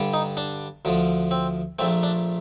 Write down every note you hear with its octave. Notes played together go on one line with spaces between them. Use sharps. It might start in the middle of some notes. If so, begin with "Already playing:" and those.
Already playing: G2 D3 G3
D#4
D4
D2 D3 F3
C4
A#1 A#2 A3 C4
D4